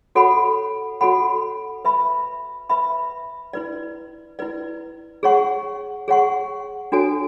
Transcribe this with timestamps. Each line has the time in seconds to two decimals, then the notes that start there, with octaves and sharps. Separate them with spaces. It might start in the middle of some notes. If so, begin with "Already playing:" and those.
0.15 F#4 A4 C#5 F#5 B5
1.01 F#4 A4 C#5 F#5 B5
1.85 B4 E5 B5
2.69 B4 E5 B5
3.53 E4 B4 D5
4.39 E4 B4 D5
5.23 G#4 C#5 F#5 C#6
6.08 G#4 C#5 F#5 C#6
6.92 D4 F#4 A4 C#5 G#5